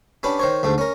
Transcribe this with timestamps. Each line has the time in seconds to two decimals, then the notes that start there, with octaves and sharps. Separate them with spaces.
0.23 C#4 D4 G4 B4
0.39 D#3 C5 C#5
0.63 D2 G#2 A3
0.78 C#4 A#4